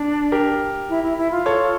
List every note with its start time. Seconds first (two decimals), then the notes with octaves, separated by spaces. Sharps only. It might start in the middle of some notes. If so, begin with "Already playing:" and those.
Already playing: D4
0.32 G4 A#4
0.89 E4
1.03 E4
1.18 E4
1.31 F4
1.46 A4 C#5